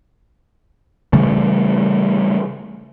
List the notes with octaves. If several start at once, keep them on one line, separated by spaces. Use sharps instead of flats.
C#3 E3 G3 A3